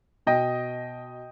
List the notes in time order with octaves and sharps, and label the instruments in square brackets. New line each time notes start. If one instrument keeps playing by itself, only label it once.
[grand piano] B2 D#5 G5